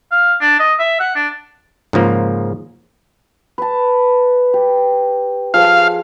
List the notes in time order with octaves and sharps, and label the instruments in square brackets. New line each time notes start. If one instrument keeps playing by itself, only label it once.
[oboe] F5
D4
D#5
E5
F#5
D4
[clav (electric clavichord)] G#2 C#3 F3 A#3
[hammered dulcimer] B4 A5
G4
[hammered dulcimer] F3 G#4 [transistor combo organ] F5